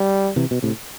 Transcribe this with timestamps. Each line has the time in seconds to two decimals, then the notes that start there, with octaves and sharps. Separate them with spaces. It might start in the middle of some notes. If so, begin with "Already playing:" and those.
Already playing: G3
0.36 C3 E3
0.51 B2
0.63 A2 C3